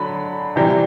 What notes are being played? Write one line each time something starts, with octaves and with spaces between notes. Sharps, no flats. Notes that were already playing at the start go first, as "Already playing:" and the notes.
Already playing: D3 F#3 B5
C3 E3 G3